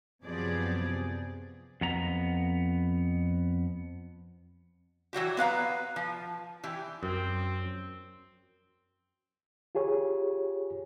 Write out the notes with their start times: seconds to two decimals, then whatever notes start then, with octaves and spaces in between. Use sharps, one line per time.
0.24 F#2 C3 F3 B3 G#4 D5
1.81 F2 B3 A#5
5.13 E3 F#3 F#4 G4
5.37 B3 B4 F5 A#5
5.96 F3
6.64 E3 G4
7.03 F#2 C4
9.75 F4 G4 G#4 C#5